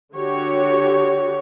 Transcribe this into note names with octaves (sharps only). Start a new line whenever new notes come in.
D3 F#4 G4 C#5